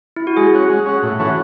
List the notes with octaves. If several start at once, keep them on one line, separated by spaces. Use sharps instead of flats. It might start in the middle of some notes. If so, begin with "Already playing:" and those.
E4
F#4
G#3 G#4
C#4 F#4
G#3
C#4 F#4
A2
E3 A3 C#4 F#4